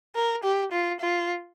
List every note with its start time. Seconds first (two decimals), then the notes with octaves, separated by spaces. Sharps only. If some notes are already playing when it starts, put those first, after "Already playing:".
0.16 A#4
0.44 G4
0.72 F4
1.00 F4